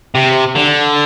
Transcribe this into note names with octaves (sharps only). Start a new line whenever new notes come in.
C3
D3